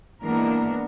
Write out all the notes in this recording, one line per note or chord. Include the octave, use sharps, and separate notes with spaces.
E3 G#3 A#3 B3 D4 A#4